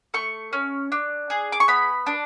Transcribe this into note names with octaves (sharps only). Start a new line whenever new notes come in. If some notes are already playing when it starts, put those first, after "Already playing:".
A3 C#6
C#4
D4
G#4
D6
C#6
B3 B5
D4